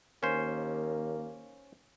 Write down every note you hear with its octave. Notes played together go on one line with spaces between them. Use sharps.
D#2 A#3 C#4 C5